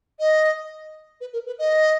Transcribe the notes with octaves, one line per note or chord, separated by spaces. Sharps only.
D#5
B4
A#4
B4
D#5